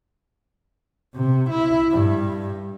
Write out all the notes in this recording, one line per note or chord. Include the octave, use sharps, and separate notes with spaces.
C3
E4
G2